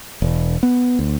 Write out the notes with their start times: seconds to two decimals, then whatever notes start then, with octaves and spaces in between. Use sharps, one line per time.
0.22 E1
0.63 B3
0.99 D2